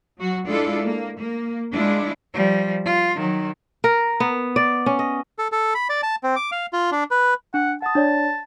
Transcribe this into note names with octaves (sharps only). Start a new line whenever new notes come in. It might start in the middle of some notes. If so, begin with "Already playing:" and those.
F#3 F#4
G#3 D4 E4 F4 A4
A#3
A#3
G#3 D4 E4 F4
F3 G3
F4
D#3 F#3
A#4
B3
D5
C#4
D#5
A4
A4
B5
D5
A5
C4
D6
F5
F4
D4
B4
D4 F#5
F#5 A5 D#6
D4 C#5 D5